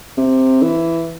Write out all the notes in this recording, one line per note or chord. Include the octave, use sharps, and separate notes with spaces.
C3
E3